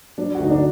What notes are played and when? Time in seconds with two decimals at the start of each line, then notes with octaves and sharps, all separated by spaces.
0.18 F#3 D4
0.35 F#4
0.40 D2 D#4
0.50 D4